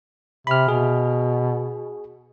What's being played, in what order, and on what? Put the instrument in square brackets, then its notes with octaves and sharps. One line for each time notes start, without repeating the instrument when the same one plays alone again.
[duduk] C3 [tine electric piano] B5 F6
[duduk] B2 [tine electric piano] G#4